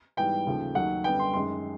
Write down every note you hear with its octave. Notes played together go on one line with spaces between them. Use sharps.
G#2 E3 G3 B3 G5
D#2 C#3 F3 A3
D#2 D#3 F#3 A3 F#5
F#2 D3 G3 B3 G5
C6
F#2 D#3 G#3 C6